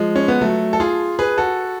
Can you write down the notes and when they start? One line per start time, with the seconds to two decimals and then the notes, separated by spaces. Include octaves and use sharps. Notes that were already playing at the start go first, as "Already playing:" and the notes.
Already playing: F3 G#3
0.16 C#4
0.28 B3
0.41 F#3 A3
0.73 A4
0.80 F4 G#4
1.19 G#4 B4
1.38 F#4 A4